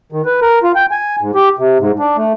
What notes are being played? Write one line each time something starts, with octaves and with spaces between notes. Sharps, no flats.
D#3
B4
A#4
F4
G5
G#5
G#2
G4
C3
G#2
D4
A3